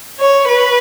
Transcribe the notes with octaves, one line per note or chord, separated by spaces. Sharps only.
C#5
B4